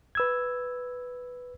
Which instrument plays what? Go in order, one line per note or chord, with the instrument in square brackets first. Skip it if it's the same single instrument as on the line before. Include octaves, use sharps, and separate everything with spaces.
[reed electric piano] B4 E6 G#6